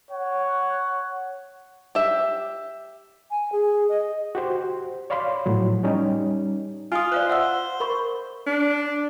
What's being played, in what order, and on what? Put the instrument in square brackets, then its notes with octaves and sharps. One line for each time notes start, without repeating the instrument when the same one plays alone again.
[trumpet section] C#5 F#5
[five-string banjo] G4 E5
[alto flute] G#5
G#4
D#5
[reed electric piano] F#4 G4 C5
C#5 D5 F5 B5 C6
A2 F3 F#3
G3 C#4 D#4
[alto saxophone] F4 [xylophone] G#5 D#6
[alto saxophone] C5 [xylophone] D5 F5 F#6
[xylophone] E5 F#5 E6
A#4 B5 C#6
[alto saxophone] D4